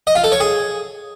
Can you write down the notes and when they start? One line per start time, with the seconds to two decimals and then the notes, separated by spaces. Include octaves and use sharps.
0.07 D#5
0.15 F4
0.24 A4
0.32 C#5
0.40 G#4